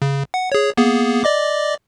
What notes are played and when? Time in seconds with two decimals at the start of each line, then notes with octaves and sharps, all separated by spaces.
0.02 C#3
0.34 F#5
0.52 G#4 C#5
0.77 A#3 B3 G#4
1.24 D5 D#5 D6